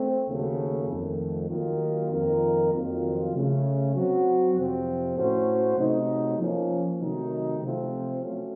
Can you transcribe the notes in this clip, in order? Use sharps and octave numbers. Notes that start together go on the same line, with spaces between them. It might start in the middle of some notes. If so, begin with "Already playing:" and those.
Already playing: A3 C4
D#2 C#3 F#3 A3
F2 D#3 A3
D#2 D#3 F#3 A#3 F4
F2 D#3 A#3 F4 A#4
F2 D#3 F#3 A#3 F4
C#3 A3 C#4
F#3 C4 F#4
F2 C3 F3 C4
A2 A3 C#4 F#4 C5
C3 F#3 A3 D#4
F3 A#3 C#4
C3 D#3 F#3 A3 D#4
C3 F3 A3 C4 F4
F#3 A3 C#4